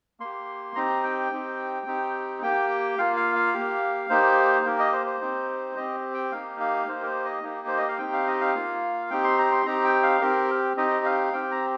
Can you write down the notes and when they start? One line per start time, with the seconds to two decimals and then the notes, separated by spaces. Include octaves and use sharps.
0.20 A#3 G4 C6
0.75 C4 D#4 G4 A#5
1.03 G5
1.32 C4 D#4 G4
1.86 C4 D#4 G4
2.42 A#3 G4 G5
2.98 A#3 F4 F5
3.16 F5
3.36 F5
3.54 A#3 G4
4.10 A#3 D#4 G4 C5
4.65 A#3 G4 A#4
4.79 D#5
4.92 C5
5.06 C5
5.21 C4 D#4 G4
5.76 C4 G4 D#5
6.14 G5
6.32 A#3 D#4 G4 F5
6.60 F5
6.87 A#3 D#4 G4 C5
7.03 A#4
7.06 C5
7.25 D#5
7.43 A#3 D#4 G4
7.68 C5
7.78 D#5
7.88 F5
7.99 C4 D#4 G4 G5
8.13 F5
8.27 D#5
8.41 F5
8.55 A#3 F4
9.10 C4 D#4 G4 G5
9.24 C6
9.39 A#5
9.52 C6
9.65 C4 D#4 G4 A#5
9.84 G5
10.03 F5
10.21 C4 G4 A#4
10.77 C4 D#4 G4 D#5
11.05 F5
11.33 C4 G4 G5
11.51 A#5